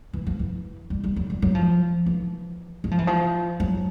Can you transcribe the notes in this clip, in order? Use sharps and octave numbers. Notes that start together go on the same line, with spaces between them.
E3
F3
E3
G3
G3
F#3
G3
F#3
F3
E3
F#3
F3
E3
F3
F#3